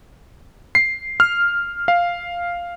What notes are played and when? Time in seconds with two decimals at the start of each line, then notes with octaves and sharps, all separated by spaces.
0.75 C7
1.20 F6
1.88 F5